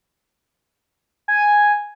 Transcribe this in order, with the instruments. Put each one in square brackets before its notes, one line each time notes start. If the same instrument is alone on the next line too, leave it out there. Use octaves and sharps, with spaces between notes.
[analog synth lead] G#5